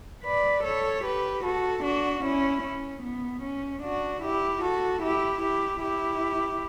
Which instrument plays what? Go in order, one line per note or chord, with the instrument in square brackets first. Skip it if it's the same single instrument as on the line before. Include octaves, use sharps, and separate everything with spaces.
[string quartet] B4 D5
A4 C#5
G4 B4
F#4 A4
D4 F#4
C#4 E4
C#4
B3
C#4
D4 F#4
E4 G4
F#4 A4
E4 G4
E4 G4
E4 G4